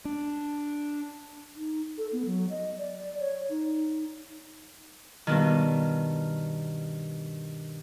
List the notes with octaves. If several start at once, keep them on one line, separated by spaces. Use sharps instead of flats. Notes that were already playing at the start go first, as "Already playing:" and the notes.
D4
D#4
A4
B3
F#3
D#5
D5
C#5
D#4
G2 B2 D#3